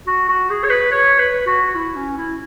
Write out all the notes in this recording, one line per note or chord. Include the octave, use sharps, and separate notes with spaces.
F#4
F#4
G#4
C#5
B4
C#5
B4
F#4
E4
C#4
E4